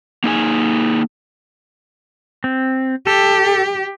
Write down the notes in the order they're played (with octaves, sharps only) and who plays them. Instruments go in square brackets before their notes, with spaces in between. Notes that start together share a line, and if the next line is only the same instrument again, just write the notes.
[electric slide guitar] A#3 D#4 G#4 G#5
[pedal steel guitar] C4
[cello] G4 [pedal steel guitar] A4